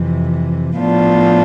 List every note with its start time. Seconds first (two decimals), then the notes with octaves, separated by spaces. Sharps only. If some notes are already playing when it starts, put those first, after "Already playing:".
Already playing: F2 C3 E3
0.79 A2 F3 B3 D4 F4